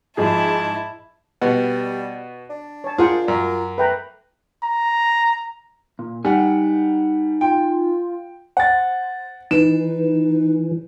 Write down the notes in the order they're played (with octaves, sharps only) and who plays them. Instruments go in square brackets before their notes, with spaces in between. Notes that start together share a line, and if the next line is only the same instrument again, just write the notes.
[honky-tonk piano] G#2 F3 G#4 [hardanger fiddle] E4 A5
[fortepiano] B2 B3 [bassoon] G3 [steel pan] F#5
[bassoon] D4
[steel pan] C#5 A5
[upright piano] F4 [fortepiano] G#4 A#4 [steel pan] C5 F#5
[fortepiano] F#2 [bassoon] A#4
[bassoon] A3 [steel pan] B4 G5 A#5
[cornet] A#5
[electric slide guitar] A#2
[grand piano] G3 F#5 [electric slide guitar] D#4 G#5
[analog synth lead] F4 [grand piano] G5
[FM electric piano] C5 [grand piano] F#5 A6
[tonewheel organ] E3 [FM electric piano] D#4 B4 [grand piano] E7